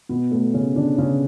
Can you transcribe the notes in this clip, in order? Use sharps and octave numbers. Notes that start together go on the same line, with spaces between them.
B2 B3
A2 A3
C#3 C#4
D3 D4
C#3 C#4